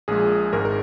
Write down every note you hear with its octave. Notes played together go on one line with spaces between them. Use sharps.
A#1 A#2 G#3 G#4
G#1 G#2 G#3 A#4
A#4